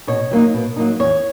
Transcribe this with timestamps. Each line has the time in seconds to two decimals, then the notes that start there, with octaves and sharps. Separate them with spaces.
0.07 B2 C#5
0.31 F#3 A#3 D#4
0.54 B2
0.76 F#3 A#3 D#4
0.99 E2 C#5